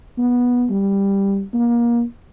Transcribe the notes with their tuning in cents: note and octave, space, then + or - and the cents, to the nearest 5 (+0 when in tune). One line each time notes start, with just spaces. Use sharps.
B3 -15
G3 +10
A#3 +25